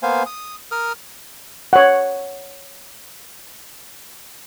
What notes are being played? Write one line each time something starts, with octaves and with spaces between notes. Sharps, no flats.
A#3 B3 C5 F5 G#5
D#6
A#4 D#6 F6
C#5 F#5